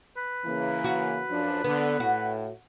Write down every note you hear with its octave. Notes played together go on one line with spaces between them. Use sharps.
B4
C#3 E3 A#3
F#4
F#2 F3 D4
D3 B3
A2 F#4